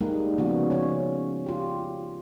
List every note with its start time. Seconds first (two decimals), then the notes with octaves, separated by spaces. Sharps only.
0.01 G3 G#3 A#3 D#4
0.38 C#3 F3 G#3 B3 F#4
0.70 C#3 C#4 C#5
1.46 F4 G4